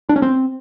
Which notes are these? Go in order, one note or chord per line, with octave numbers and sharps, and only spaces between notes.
D4
C#4
C4